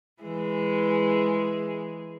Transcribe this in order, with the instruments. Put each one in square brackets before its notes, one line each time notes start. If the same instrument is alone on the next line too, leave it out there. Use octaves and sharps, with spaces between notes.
[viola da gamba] E3 G#3 G#4